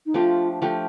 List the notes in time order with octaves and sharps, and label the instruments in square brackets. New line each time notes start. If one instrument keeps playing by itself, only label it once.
[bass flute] D#4
[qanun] F3 A3 D4 G4 [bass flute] F4
[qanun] F3 A3 D4 G4